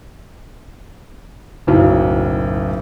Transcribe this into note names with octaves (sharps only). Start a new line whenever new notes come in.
F#1 B1 A2